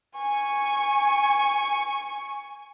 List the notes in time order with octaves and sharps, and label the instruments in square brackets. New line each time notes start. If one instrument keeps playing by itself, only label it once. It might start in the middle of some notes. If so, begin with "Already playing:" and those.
[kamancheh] G#5 C#6